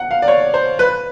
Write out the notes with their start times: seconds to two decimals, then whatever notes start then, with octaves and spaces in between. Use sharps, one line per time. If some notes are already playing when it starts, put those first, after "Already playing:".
Already playing: F#5
0.11 F5
0.22 D5
0.28 C#5
0.54 C5
0.79 B4